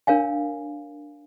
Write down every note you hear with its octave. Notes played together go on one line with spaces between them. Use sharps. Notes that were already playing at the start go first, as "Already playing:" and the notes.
D4 A#4 C#5 F5 G#5